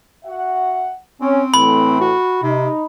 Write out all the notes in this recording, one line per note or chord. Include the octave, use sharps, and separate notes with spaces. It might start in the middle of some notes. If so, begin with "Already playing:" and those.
F#4 E5 F#5
C4 C#4
A2 E3 A3 B5
F#4
C3 D#4